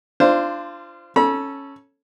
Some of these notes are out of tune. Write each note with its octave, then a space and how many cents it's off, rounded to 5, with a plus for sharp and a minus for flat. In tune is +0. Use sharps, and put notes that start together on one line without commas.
D4 +10 F4 -25 C5 +0
C#4 -5 A4 +0 B5 -40